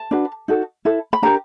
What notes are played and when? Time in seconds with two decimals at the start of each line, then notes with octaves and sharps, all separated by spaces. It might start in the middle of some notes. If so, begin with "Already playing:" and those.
Already playing: A5
0.11 D4 F#4 B4
0.48 D#4 F#4 A4
0.85 E4 A4
1.13 B5
1.22 D4 G4 A#4 A#5